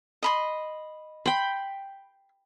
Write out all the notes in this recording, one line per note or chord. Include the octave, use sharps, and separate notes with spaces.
D#5 B5 C6
G5 B5 C6